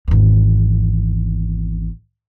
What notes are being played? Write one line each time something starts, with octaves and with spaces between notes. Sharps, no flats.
G#1 E2